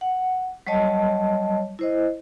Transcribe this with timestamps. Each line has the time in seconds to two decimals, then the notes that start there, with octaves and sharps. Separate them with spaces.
0.01 F#5
0.67 F#3 G3 C#5 D#5 A5
1.79 E4 C5 D#5